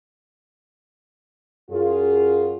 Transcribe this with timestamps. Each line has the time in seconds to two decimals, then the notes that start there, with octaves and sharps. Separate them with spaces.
1.70 F#2 F4 G#4